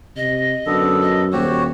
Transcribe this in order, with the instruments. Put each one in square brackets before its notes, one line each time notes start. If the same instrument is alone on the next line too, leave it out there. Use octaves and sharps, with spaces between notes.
[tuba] C3 [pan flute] D#5
[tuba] F#2 [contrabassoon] D3 [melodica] B3 A4
[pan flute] D#5
[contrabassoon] D#1 [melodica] F#4 G4 C#5 [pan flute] C5